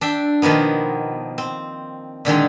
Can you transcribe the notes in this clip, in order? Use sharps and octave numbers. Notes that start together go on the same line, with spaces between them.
D4 E5 G5
B2 D#3 F3 A#3 B3
C4
A#2 D3 D#3 G#3